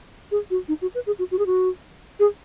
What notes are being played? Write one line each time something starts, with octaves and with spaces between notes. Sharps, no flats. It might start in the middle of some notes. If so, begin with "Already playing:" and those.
G#4
F#4
D#4
F#4
B4
G#4
F#4
F#4
G#4
F#4
G#4